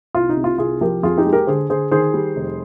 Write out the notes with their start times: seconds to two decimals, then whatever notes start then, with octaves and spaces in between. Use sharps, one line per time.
0.15 C2 F4
0.29 D#4
0.37 C3
0.44 F4
0.58 C2 F4 G#4
0.81 F3 G4 A#4
1.03 F2 F4 G#4
1.18 D#4 G4
1.25 G#3
1.33 G4 A#4
1.47 D3 G#4 C5
1.69 D3 G#4 C5
1.91 D#3 G#4 C5
2.14 G3
2.36 F1